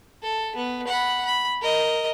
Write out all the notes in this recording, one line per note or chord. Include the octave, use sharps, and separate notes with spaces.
A4
B3
F#5 B5
B5
A#4 D#5